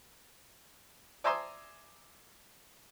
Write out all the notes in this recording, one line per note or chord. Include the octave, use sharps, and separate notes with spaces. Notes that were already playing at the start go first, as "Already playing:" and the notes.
D5 E5 G#5 A#5 C6 D#6